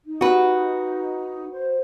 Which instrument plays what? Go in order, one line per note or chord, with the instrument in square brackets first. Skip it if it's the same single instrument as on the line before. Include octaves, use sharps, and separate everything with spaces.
[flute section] D#4
[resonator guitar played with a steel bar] F#4 B4
[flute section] C5